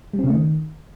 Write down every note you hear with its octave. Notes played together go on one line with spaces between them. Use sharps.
G3
C4
C#3
A3
D#3